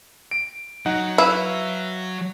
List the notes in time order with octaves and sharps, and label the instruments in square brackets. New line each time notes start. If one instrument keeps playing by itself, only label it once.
[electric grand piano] D7
[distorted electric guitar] F#3 [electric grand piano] D#4 F#5
[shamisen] E4 [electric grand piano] B4 F5 E6